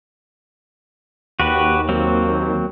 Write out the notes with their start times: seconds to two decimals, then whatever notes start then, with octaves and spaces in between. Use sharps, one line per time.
1.40 D#2 F#4 G4 B4
1.89 F#3 A#3 C4